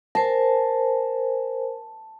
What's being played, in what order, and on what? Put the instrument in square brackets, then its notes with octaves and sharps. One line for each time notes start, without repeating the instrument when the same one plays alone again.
[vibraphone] A#4 C5 G#5 [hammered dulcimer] A5